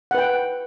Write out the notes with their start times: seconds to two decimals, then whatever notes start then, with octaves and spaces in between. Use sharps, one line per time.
0.11 F#5
0.15 B4
0.18 G5